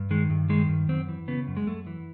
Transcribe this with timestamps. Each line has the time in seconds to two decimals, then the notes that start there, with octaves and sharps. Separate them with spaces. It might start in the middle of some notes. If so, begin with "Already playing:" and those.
Already playing: G2
0.11 D#3 G#3
0.30 G2
0.49 D#3 G#3
0.69 G2
0.89 F#2 C4
1.09 E3
1.28 C#3 B3
1.48 F#2
1.57 G#3
1.67 F#2 A3
1.87 E3